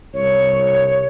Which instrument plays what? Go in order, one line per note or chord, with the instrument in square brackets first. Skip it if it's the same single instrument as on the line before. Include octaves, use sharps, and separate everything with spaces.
[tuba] C2 [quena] C#5